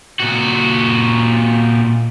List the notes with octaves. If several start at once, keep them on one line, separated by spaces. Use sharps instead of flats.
A#2 F#4